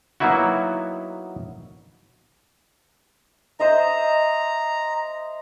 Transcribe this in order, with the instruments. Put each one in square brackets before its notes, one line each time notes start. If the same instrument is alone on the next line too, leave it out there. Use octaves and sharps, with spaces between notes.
[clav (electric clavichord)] F#3 A#3 B3 D#4 E4 F#4
[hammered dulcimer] C5 D#5 E5 [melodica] A#5